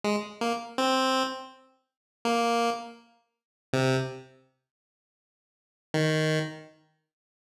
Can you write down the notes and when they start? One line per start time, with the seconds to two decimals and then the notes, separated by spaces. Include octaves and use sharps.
0.04 G#3
0.41 A#3
0.78 C4
2.25 A#3
3.73 C3
5.94 D#3